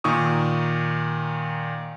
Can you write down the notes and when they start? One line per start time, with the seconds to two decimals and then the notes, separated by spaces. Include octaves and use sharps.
0.04 A#2 D#3 C#6 D#6